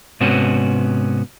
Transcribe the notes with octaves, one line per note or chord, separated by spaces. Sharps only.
G#2 C3 B3 C#4 F#4